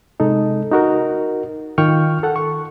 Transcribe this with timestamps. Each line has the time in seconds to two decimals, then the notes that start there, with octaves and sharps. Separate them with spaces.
0.20 C3 G#3 D#4 A4
0.71 D#4 F#4 A#4
1.78 D#3 F4 G5 C#6 F6
2.23 A4 F#5
2.36 C#6